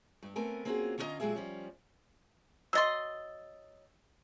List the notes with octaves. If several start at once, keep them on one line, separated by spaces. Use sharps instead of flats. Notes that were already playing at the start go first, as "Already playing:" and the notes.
G2
A3 B3 C4 A#4 G#5
A#3 C4 C#4 F4 F#4 G#4
D3 C#4 F4 F#4 D#5 A#5
A#2 F#3 G#3 G4 G#4 E5
F3 G3 C#4
F#3 D#5 C6 E6 A6